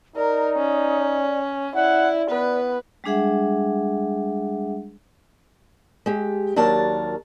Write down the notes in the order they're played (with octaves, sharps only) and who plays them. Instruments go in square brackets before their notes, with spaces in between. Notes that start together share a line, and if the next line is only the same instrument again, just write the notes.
[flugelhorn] D#4 [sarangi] A#4 [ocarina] D5
[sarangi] C#4
[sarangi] E4 [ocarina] D5 [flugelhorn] F#5
[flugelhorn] B3 [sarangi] B4
[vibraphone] G3 G#3 D4 G#4 E5 F#5
[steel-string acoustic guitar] G#3 G4
D#2 F#3 D4 A#4 A5